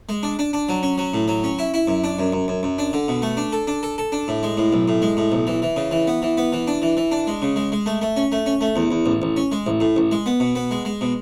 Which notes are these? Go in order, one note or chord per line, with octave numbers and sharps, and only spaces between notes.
G#3
D4
D4
D4
F#3
C#4
F#3
A2
F#3
C#4
E4
E4
F#2
D4
F#2
F#2
F#2
F#2
D4
D3
B2
A3
D4
A4
D4
A4
A4
D4
A2
G#3
A2
B1
A2
G#3
A2
B1
E3
E3
C#3
E3
B3
E3
B3
E3
D4
E3
E3
D4
G#3
C#3
G#3
G#3
A3
A3
C#4
A3
C#4
A3
E2
E2
A1
A1
C#4
G#3
A1
A2
A1
G#3
B3
B2
B3
G#3
G#3
B2